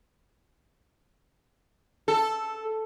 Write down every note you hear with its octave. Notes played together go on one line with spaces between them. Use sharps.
A4